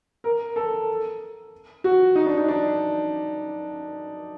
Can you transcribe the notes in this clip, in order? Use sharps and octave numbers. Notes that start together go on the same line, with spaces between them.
A#4
A4
F#4
D#4
D4
D#4
D4